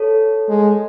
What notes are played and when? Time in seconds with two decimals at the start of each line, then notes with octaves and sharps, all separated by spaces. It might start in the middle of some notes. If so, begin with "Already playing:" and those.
Already playing: A4 C#5
0.49 G#3